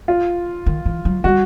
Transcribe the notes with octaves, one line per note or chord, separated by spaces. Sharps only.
F4
D#3
E3
F#3
G3 F#4